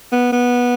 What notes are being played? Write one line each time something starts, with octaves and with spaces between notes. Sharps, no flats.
B3
B3